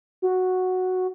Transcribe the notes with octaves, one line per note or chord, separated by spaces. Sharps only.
F#4